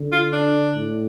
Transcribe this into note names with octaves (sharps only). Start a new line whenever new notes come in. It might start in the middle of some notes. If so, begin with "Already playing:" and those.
Already playing: D3
F4
D4
A2